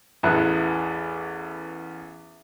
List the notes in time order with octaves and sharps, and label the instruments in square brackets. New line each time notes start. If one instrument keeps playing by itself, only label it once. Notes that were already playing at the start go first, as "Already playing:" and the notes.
[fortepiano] A1 E2 B3 E4 F#6